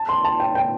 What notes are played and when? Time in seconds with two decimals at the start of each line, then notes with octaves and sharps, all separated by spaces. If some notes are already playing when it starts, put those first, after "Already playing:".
Already playing: A5
0.09 C6
0.24 A5
0.40 G5
0.55 G5